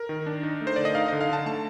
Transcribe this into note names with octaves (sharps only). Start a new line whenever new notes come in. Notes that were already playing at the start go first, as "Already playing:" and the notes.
Already playing: A#4
D#3
D4
D#4
A3
C5
D3 D5
D#5
D#4 F5
D3 D#5
F5
D3 A5
A3 A5